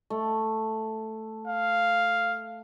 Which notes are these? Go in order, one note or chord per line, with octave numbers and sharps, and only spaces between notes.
A3
F5